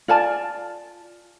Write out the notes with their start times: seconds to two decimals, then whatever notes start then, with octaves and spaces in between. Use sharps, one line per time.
0.08 F4 D5 G#5 A5